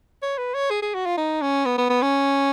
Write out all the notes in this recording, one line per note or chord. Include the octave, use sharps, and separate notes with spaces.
C#5
B4
C#5
G#4
G#4
F#4
F4
D#4
C#4
B3
B3
B3
C#4